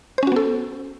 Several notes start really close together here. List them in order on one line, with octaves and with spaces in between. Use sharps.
C5 C#4 F#4 B3 A4